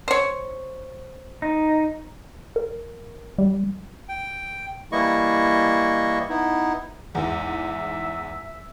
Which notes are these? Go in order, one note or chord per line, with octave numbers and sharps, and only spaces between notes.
C5 C#5
D#4
A#4
G3
G5
E3 G3 A#3 E4 D#5 C#6
B3 D#4 E4
E2 G#2 E5